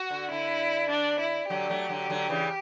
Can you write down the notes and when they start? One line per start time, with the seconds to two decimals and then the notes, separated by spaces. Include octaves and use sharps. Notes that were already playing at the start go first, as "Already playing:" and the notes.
Already playing: F#4
0.10 D3
0.31 D3 E4
0.90 D4
1.20 E4
1.50 D3 F#3 G4
1.69 F#3 A3
1.89 D3 F#3
2.10 D3 F#3
2.29 C#3 E3